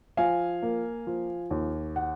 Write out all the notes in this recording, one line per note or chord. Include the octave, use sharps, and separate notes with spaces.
F3 F5 G#5
A#3
F3
D#2
F#5